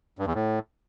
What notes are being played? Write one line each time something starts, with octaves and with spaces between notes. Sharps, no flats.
G2
E2
A2